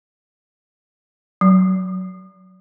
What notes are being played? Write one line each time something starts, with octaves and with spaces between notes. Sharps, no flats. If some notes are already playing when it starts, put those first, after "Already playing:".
F#3